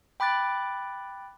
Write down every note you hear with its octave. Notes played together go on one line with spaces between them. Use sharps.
G5 B5 D6 F#6 A6